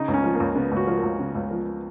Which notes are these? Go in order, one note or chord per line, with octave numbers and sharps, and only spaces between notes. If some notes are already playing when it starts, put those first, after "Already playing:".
Already playing: C#3 D#4
C#2
C#4
F3
A#3
C#2
C#3 B3
C#2
F#4
F3
A#4
C#2
C#3
C#2
F3